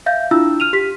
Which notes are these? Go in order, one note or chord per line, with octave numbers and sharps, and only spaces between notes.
E5 F5 G6
D4 E4 F4 E6
F6 D#7 F7
G4 B6